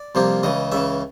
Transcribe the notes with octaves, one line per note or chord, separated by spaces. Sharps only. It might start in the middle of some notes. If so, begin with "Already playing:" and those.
Already playing: D5
C2 C3 F3 A#3
C#2 C#3 E3 D#5
C#2 C#3 E3 E5